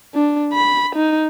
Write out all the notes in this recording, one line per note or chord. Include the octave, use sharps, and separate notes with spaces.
D4
B5
D#4